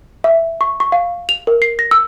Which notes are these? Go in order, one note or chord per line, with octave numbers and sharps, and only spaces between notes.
E5
C#6
C#6
F5
F7
A#4
C7
A#6
E6